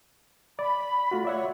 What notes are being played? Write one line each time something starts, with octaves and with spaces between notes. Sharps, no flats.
D5 B5
A3 F4 F#4
C#5 D5 E5 F#5